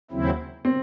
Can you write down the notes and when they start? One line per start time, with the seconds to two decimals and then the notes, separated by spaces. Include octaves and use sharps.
0.11 D#2 C#3 F#3 C4 E4
0.65 C4